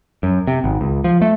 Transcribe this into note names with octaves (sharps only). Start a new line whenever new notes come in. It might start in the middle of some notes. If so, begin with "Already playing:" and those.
F#2
C3
G#1
C#2
F3
A3